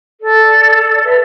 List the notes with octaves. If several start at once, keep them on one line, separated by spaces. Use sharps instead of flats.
A4 D5
D5
B4 E5